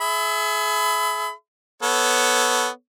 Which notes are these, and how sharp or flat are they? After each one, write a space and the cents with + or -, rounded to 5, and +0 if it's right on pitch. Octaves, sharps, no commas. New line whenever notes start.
G#4 +35 E5 +0 B5 +30
B3 +0 A4 +0 C#5 +5